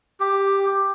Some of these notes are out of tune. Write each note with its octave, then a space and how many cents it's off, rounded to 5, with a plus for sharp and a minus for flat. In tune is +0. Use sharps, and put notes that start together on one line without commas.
G4 +5